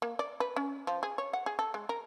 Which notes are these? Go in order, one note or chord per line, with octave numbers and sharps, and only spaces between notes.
A#3
D5
B4
C#4
F3
G#4
C#5
F#5
G#4
A4
G#3
A#4